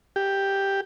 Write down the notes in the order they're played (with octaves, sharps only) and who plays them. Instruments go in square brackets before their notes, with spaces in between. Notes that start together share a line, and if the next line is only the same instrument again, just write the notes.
[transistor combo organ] G4